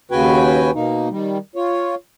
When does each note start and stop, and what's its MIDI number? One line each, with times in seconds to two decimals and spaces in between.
0.11 0.71 39
0.11 0.71 49
0.11 0.71 66
0.11 0.71 71
0.11 0.71 79
0.11 0.71 80
0.75 1.08 47
0.75 1.08 58
0.75 1.08 63
1.10 1.38 51
1.10 1.38 55
1.56 1.95 65
1.56 1.95 73